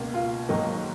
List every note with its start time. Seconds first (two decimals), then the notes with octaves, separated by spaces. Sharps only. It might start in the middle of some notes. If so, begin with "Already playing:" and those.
Already playing: C#2 B2 A#3
0.14 F4
0.49 G#2 D#3 F#3 A#3 D#4